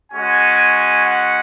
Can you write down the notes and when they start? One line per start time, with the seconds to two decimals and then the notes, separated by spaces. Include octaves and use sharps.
0.12 G#3 C#4 F#4 G#5
1.05 F#5